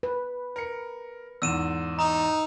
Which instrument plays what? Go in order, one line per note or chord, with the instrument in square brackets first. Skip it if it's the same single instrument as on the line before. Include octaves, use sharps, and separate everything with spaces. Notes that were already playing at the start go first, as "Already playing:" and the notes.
[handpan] B4
[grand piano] A#4 C#7
[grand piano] E2 G#2 [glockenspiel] E6 D#7 E7
[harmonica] D#4 [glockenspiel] A#5